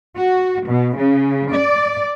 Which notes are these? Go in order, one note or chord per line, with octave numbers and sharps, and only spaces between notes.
F#4
B2
C#3
D5